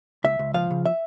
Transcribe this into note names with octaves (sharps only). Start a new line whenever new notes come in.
C#2 E5
C#2
F3 F5
C#3
E5